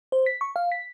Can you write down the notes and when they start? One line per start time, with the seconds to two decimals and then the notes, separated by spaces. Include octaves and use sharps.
0.12 C5
0.26 B6
0.41 C#6
0.56 F5
0.72 B6